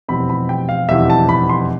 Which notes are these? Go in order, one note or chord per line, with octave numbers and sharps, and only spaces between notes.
F1 E2 B2 G3 C4 B5
B5
G5
F5
F1 E2 B2 G3 C4 E5
A5
B5
C6